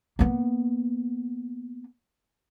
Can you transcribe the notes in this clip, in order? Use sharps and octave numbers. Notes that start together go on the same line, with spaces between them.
A#3 B3